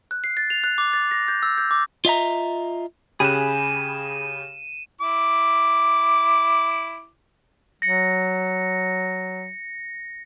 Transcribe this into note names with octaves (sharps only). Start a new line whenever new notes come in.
F#6
C7
A6
F7
F#6
D6
A6
A#6
G6
E6
G6
D6
F4 D#5 E5 A#5
C#3 G4 G#4 G#5 B5 F#6 D#7 E7
E4 D6
F#3 A#6 C#7